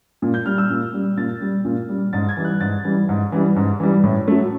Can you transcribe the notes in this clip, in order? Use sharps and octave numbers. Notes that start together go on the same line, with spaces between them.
A#2
G6
G3 F6
E6
A#2
G3
A#2 A6
G3
A#2
G3
G#2 A6
G#6
E3 G3
F#6
G#2 A6
E3 G3
G#2
E3 G3
G#2
E3 G3
A2
F#3 A3